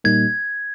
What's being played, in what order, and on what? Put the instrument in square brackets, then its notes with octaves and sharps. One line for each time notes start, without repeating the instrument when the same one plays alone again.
[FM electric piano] A#2 G3 A#3 D#4 [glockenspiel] G#6